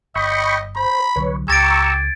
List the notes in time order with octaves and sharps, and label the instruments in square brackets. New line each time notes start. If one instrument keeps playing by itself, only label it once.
[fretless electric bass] G1 [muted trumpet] D#5 [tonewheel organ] G5 B5 C#6
[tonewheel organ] C5 [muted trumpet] B5
[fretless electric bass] C2 D3 F#3 [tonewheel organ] B4 C#5
[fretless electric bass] C#2 [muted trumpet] G4 [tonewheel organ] A#5 C#6 E6 [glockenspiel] G#6 A6 D7